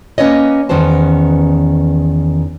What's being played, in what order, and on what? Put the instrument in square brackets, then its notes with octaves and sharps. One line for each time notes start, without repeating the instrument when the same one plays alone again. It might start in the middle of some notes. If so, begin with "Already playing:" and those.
[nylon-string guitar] A#3 C#4 B4 C#5 D#5
E2 D#3 C#4 B4 C5 A5